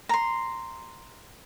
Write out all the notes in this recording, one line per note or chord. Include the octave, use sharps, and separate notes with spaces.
A#5 C6